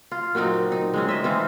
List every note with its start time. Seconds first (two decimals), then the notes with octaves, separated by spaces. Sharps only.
0.11 F4
0.35 A#2 F#3 C4 D#4
0.72 D#4
0.94 G#3 C4 C#4
1.09 D#5 E5
1.24 E3 C4 D#4 F4